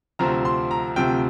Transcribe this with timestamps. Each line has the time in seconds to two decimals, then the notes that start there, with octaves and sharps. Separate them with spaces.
0.19 D2 C3 F3 C4 A#5
0.45 C6
0.71 A#5
0.96 D2 C3 F3 C4 G5